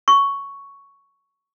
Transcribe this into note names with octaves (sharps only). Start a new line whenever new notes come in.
C#6